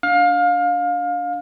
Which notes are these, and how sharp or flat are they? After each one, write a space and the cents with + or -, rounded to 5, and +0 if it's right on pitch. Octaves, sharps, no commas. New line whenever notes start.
D4 -20 F5 +25